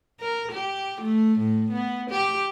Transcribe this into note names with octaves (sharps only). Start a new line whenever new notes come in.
A#4
G4
A3
A2
B3
G4